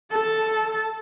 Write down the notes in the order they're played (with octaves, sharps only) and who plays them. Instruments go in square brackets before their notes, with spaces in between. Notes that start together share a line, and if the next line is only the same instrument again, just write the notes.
[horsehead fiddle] A4 A5